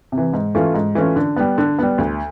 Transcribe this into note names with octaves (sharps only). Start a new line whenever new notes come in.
C3
E3
G#2
E3 A3 C#4 F4
G#2
E3 A3 C#4 F4
D3
G3 B3
D3
G3 B3
D2